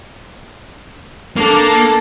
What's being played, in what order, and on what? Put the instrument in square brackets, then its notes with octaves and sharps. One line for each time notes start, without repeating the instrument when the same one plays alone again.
[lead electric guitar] A#3 [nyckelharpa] D4 A4